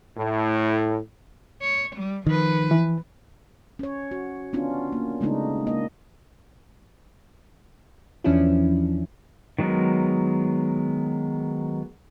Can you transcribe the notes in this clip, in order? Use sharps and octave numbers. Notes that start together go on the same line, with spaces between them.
A2
C#5
G3
D#3 F3 B4
E3
C#4 C#5
F#4
B3 C#4 D4 F4
A#3
C#3 G#3 A3 B3 D4 D#4
A#3 D#5
E2 E3 F3 C#4 D4 E4
D#3 F#3 G#3 B3 A#4